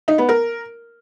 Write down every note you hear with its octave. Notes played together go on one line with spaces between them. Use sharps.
D#4
B3
A#4